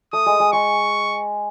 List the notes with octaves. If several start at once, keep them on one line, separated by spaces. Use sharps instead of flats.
A3 D#6
G#3
G#3
G#3 C#6